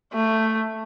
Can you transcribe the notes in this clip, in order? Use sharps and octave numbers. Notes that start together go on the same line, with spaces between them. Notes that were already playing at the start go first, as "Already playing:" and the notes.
A3